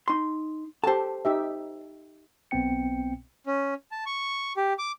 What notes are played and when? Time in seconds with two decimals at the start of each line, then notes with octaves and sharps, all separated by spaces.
0.08 D#4 C6
0.84 G4 A4 C5 A5
1.25 D#4 G4 E5
2.51 B1 B3 C4 G5 C#7
3.46 C#4
3.91 A5
4.06 C#6
4.57 G4
4.79 D6